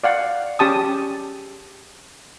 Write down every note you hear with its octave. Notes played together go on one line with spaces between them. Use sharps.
D5 F5 F#5
C#4 G4 A5 D#6